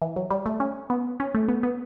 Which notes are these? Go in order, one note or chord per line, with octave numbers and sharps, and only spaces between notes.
E3
F#3
G3
A3
C#4
B3
C#4
A3
B3
B3